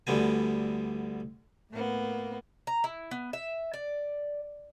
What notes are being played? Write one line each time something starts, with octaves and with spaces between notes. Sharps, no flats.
D2 D3 G3 B3 G#5
A2 A#3 B3
A#5
E4
B3
E5
D5